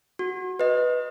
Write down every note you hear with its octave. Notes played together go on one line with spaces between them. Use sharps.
F#4
B4 D#5